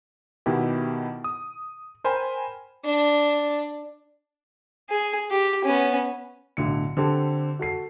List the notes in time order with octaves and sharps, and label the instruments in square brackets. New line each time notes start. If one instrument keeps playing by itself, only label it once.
[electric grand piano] B2 D#3 B3 E4 G4
D#6
A#4 C5 G5 G#5 B5
[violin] D4
[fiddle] G#4
G4
B3 C#4
[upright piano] B1 A2 D3 C#7
D3 C4 G4 A4
F#4 A4 C7